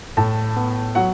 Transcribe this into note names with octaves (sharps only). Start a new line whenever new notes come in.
A2 A5
B3
F#3 F#5